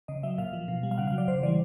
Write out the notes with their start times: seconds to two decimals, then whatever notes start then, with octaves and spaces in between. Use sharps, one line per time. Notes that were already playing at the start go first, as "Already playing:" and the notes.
0.08 C#3 D#5
0.23 F#3 E5
0.38 A#2 F5
0.53 F3
0.68 B2
0.83 G3
0.91 F5
0.98 C#3 F#5
1.07 F#3 F5
1.18 D5
1.28 C#3 C5
1.43 E3 G3 D5